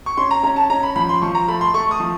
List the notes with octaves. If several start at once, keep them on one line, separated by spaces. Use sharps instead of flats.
C#6
C#4 C6
A#5
C#4 A#5
A5
C#4 A#5
B5
F3 B5
C6
F3 C#6
A#5
A3 B5
C6
A3 C#6
D#6
F3